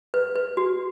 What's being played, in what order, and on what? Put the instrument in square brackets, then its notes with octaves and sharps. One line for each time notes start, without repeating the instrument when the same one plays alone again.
[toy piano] B4
B4
F#4